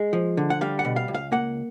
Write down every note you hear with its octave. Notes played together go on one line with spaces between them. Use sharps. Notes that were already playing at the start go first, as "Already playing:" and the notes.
Already playing: G#3
F3
D3
F#5
G3 F5
F#5
B2
F5
C#2
F5
A#3 F#5